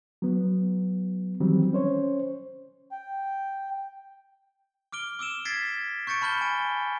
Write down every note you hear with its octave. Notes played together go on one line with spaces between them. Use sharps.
F#3 B3
D#3 E3 F#3 G3 C4
C#4 C5 C#5
G5
D6 F6 D7 G7
D6 E6 D7 E7
G#6 A6 B6 C7 D7
C#6 G6 A6 C#7 D7
A5 B5 F6 G6 G7
G#5 D7